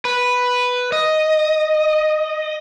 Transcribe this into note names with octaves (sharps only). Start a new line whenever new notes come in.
B4
D#5